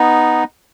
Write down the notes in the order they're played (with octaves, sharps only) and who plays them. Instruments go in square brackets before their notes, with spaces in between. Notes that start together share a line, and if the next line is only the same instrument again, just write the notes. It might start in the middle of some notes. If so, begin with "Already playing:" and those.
Already playing: [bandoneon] B3 D#4